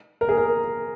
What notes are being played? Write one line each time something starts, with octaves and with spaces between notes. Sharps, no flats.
A#4
G#4
A#4